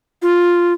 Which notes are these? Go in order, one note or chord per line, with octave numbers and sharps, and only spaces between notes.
F4